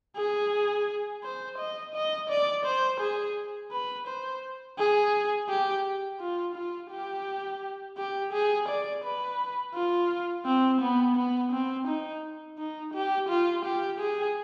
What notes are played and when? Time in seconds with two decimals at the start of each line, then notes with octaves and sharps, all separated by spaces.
0.17 G#4
1.23 C5
1.58 D#5
1.94 D#5
2.30 D5
2.65 C5
3.00 G#4
3.72 B4
4.07 C5
4.79 G#4
5.49 G4
6.20 F4
6.56 F4
6.91 G4
7.97 G4
8.33 G#4
8.68 D5
9.04 B4
9.74 F4
10.45 C4
10.81 B3
11.16 B3
11.52 C4
11.88 D#4
12.58 D#4
12.94 G4
13.29 F4
13.65 G4
14.00 G#4